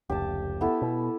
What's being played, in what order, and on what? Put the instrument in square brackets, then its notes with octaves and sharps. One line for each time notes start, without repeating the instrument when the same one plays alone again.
[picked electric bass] F1 C#2 [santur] G4 A5
[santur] B3 E4 A4
[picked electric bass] B2